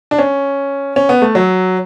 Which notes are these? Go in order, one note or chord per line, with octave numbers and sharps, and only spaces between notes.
D4
C#4
C#4
B3
A3
F#3